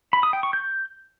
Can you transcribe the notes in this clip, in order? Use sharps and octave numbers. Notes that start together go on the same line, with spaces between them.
B5
D#6
G5
C#6
G6